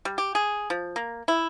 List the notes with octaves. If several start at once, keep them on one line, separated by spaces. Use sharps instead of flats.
G3
G4
G#4
F3
A#3
E4